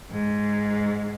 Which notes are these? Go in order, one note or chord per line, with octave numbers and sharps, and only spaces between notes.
G#2